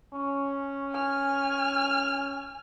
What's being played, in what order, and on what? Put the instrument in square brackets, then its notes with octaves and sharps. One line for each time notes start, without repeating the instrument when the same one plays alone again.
[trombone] C#4
[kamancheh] G#5 F6